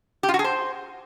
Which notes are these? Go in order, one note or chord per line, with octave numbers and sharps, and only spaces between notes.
G4
F4
F#4
G#4
C5